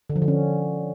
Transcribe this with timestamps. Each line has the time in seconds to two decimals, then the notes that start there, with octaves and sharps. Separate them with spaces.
0.10 D3
0.16 F3
0.22 D3
0.28 C#4